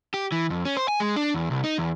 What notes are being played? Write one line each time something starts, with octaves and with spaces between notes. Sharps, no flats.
G4
E3
F2
C#4
C5
G#5
G#3
D4
E2
C2
D#4
E2